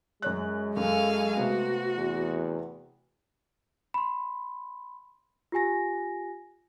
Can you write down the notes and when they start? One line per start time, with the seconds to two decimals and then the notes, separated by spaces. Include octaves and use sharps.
0.22 F#2 G#3 C#5 F#6
0.77 F#2 A4 F5 G#5
1.37 C3 A3 B3 F#4
1.97 E2
3.94 B5 C6
5.52 F4 G4 G#5 A#6